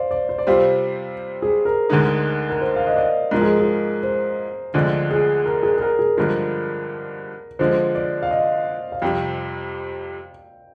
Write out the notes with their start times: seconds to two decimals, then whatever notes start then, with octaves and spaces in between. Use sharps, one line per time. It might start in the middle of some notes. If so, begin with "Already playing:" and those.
Already playing: C5 D5 F5
0.11 D5
0.29 C5
0.38 D5
0.47 C3 G3 C4 F4 C5
1.42 G#4
1.65 A#4
1.89 D2 D3 G#3 D#4
2.50 A#4
2.61 C5
2.76 F5
2.87 D#5
2.96 D5
3.31 G#2 F3 G#3 A#4
3.41 G#4
3.59 G#4
4.03 C5
4.74 D2 D3 F3 G#3 C4 D5
5.11 G#4
5.46 A#4
5.63 G#4
5.77 G#4
5.81 A#4
5.99 G#4
6.17 G2 D3 F3 G#3 A#4
7.59 D3 F3 G#3 C5
7.95 D5
8.23 F5
8.31 D#5
8.92 F5
9.02 F2 C3 G3 G5